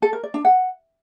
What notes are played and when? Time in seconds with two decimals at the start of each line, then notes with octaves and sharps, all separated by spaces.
0.02 A4
0.13 A#4
0.23 D5
0.34 D4
0.45 F#5